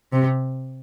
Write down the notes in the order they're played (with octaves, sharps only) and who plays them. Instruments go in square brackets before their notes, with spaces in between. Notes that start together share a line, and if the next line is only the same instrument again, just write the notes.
[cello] C3